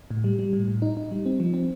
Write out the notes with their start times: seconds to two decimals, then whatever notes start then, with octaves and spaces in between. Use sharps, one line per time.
0.11 A2
0.24 G3
0.39 G3
0.53 A2
0.68 A2
0.82 D#4
0.97 D#4
1.11 G3
1.26 C4
1.40 F3
1.54 C4